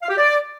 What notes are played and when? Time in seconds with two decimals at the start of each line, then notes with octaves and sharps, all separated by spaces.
0.02 F5
0.10 G4
0.18 D5